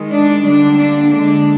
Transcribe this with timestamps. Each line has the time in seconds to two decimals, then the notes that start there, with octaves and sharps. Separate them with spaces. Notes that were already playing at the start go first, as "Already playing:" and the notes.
Already playing: D#3 G#3
0.11 D4
0.44 D3 G3 A#3 D4
0.77 D4
1.10 D3 G#3 D4